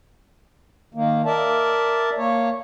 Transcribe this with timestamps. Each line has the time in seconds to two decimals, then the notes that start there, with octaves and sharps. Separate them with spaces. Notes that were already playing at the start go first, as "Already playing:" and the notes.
0.94 D#3 A#3
1.25 A#4 D5 E5 A5
2.17 A#3 C#5